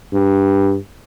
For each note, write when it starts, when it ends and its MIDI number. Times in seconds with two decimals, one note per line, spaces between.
0.13 0.77 43